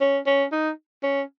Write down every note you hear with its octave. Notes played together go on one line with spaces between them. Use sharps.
C#4
C#4
D#4
C#4